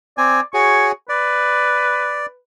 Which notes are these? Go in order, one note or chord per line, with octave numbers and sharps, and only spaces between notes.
C4 D5 G#5
F#4 G#4 C#5 C#6
B4 D5